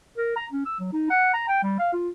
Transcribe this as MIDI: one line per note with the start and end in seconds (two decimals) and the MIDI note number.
0.18 0.36 70
0.36 0.46 82
0.51 0.65 61
0.65 0.79 88
0.80 0.92 54
0.93 1.10 63
1.10 1.30 78
1.34 1.44 82
1.48 1.60 79
1.63 1.76 55
1.79 1.90 77
1.93 2.09 65